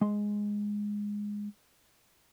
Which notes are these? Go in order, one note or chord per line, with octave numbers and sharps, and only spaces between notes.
G#3 C6